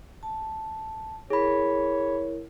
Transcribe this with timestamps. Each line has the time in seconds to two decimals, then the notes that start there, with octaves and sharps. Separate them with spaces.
0.23 A5
1.30 E4 G#4 A#4 C#5 B5